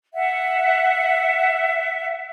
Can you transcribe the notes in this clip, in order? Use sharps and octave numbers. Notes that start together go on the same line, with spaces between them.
E5 F#5